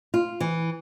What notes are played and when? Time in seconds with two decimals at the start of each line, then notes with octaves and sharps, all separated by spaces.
0.14 F4
0.40 E3